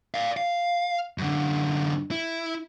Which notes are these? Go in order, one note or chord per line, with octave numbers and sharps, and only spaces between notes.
D5 F5
F5
F#2 D3
E4